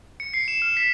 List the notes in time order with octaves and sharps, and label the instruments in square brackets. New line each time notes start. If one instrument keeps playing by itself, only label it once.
[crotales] C#7
C7
E7
F6
B6